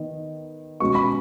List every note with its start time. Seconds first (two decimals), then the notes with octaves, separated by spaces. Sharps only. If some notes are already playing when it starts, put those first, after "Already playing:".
Already playing: D#3 B3 D#4
0.80 B2 G#3 C#4 C#6
0.95 B5